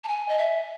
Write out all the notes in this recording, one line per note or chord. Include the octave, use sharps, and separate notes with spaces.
A5
G#5
D#5
E5